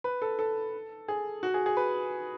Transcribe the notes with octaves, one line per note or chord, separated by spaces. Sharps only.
B4
A4
A4
G#4
F#4
G#4
G#4
B4